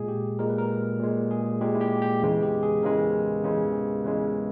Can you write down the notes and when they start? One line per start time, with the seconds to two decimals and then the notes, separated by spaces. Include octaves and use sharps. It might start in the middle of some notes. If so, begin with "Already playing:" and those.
Already playing: A#2 G#3 G#4
0.08 G4
0.39 A#2 G#3 A#4
0.49 B4
0.58 A#4
1.00 A#2 G#3
1.31 G#4
1.61 A#2 G#3 G4
1.75 E4
1.81 G4
2.02 G4
2.22 E2 C#3 E3 G#3
2.43 G4
2.63 G#4
2.83 E2 C#3 E3 G#3 A#4
3.44 E2 C#3 E3 G#3
4.04 E2 C#3 E3 G#3 B4